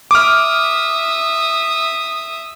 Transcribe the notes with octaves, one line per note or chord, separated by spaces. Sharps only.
E5 D6 D#6 F6